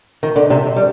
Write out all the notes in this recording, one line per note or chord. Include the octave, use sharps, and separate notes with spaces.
D#3
D3
C3
G3